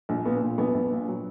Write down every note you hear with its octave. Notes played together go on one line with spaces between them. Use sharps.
A#1
A#2 B3
A#2
A#1 B3
A#1
A#2
F#3